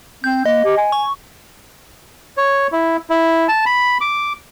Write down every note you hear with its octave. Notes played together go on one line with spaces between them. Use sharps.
C4 G6
A#3 D#5
G4
G#5
C#6
C#5
E4
E4
A5
B5
D6